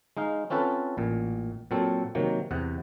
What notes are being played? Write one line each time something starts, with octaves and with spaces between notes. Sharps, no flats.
G#3 D#4 F5
C4 C#4 F4 A4 B4
A1 A#2
A#2 F#3 C4 A4
C3 D#3 F#3 A#3
E2 C3 F#5